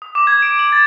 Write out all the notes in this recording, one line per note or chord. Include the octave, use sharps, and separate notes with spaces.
D#6
D6
G#6
D7
F#7
A6